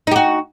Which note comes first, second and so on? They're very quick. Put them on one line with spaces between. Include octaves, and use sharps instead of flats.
D#4 G4 F#4